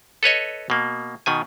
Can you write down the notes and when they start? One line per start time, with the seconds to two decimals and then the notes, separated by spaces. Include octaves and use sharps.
0.23 A4 B4 C#5 D#5
0.70 B2 A#3
1.26 B2 D#3 G#5